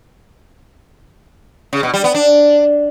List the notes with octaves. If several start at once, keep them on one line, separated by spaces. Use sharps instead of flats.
C#3
B2
G3
B3
D4